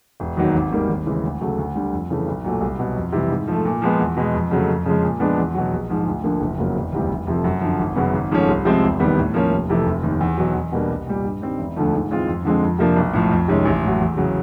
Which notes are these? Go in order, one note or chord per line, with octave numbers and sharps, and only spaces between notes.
E1
D#2 D#3 F#3
G#1
G#2 D#3 G3 A#3
D#2
C#3 E3 G#3
D2
C#3 F#3 A3
D2
D3 G3
F2
C#3 E3 A3
B1
A#2 F#3 A3
C2
B2 F#3
F2
C3 E3 G3
G#2
F3 A3
A#2
F3 G#3 B3
E2
B2 G#3
F2
C#3 F#3 A3
F2
C#3 F3 G#3
A#2
F3 G#3 B3 D4
E2
B2 F#3
A#1
G#2 F3
D2
D3 F3 A#3
F#1
F2 C#3 F#3 A#3
E1
D2 C3 E3 G3
F1
F2 C3 F3 A3
F#2
D3 F3
G#1
F#2 C#3 F#3 B3
G#1
G#2 F3 A3 C#4
C2
C3 F3 G#3 C4
E1
D#2 D#3 G3 B3
A2
F3 A#3 C#4
F1
F2 C3 E3 A3
F1
D#2 D#3
E2
B2 F#3
E2
B2 G3 A#3 D4
C2
A#2 G3
G2
D#3 G3 C4
E1
D2 D3 F3 A3
G#2
E3 G#3 C4 F4
F2
D3 F3 G#3 C4
F2
C3 F3 A#3 D4
B1
A2 F3
F2
C3 D#3 G#3 C#4
A1
A2 F#3
E2
C#3 F#3